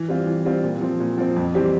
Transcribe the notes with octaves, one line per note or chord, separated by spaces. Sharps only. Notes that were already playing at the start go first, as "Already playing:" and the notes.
Already playing: E3
G3 C4 F4
E3
G3 C4 F4
A#2
F3 C4
A#2
F3 C4
F2
E3 G3 C4 G4